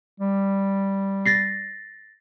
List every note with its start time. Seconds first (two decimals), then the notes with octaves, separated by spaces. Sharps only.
0.20 G3
1.26 A6 A#6 C7